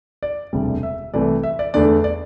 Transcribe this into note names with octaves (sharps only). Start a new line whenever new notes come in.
D5
E1 D2 C3 G3
E5
C2 C3 E3 A3 D5
E5
D5
E2 D3 A3 D5
D5